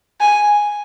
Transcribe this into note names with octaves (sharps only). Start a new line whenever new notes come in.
G#5